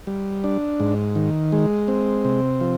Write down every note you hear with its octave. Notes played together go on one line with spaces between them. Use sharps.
G3
D4
G#2
D#3
G#3
C4
C3
F3